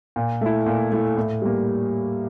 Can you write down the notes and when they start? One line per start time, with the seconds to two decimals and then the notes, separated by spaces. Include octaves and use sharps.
0.16 A#2
0.41 A3 E4
0.66 A#2
0.92 A3 E4
1.17 A2
1.42 G3 A#3